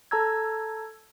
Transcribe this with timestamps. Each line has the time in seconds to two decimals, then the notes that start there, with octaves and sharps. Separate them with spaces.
0.11 A4 A5 A#5 E6 G#6